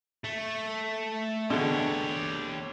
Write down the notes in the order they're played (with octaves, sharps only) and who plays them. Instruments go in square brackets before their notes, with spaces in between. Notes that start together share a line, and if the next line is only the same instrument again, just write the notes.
[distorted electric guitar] A3
[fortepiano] B2 D3 G#3 [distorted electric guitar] G4 C#5